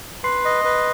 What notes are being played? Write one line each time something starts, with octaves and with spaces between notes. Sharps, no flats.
B4 C6 C7
D#5
B4